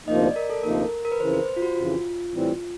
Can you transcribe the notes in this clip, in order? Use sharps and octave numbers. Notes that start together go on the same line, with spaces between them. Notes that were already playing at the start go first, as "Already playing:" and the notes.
D2 C3 F3 A#3 D#4 D#5
D5
A#4
A4
D2 C3 F3 A#3 D#4 A#4
A#4
B4
F2 C#3 E3 C5
C5
C5
F4
F#4
F2 C#3 E3 F4
A2 E3 G3 C4